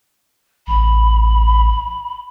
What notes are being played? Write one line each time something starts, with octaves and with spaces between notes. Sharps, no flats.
A1 B5